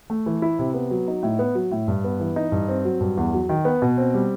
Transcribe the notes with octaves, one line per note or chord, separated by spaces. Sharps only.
A3
E3
E4
C3
B3
F#3
D#4
A2
B3
F#3
A2
G2
B3
E3
D#4
G2
C4
F#3
G2
E2
F#3
D#3
B3
B2
C4
G3